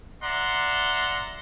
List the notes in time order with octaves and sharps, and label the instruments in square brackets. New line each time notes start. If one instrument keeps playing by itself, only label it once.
[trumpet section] D5 E5 F#5 A#5 C6